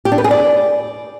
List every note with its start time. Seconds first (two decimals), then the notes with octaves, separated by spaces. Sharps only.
0.05 G4
0.12 D4
0.18 B4
0.24 G#4
0.31 D5